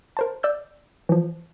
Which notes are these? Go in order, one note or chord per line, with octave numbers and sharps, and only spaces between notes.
A#4 C5 A5
D5 E6 G6
E3 F3